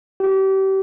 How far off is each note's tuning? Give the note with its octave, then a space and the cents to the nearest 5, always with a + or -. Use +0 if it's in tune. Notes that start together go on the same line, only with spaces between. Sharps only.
G4 -30